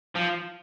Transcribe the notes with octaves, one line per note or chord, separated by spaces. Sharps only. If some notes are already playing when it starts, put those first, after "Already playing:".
F3